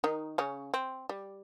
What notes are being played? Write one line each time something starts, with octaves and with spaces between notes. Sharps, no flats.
D#3 D#4
C#3 C#4
C4
G3